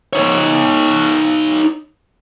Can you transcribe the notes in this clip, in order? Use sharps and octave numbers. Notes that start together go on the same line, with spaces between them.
D#4 C#5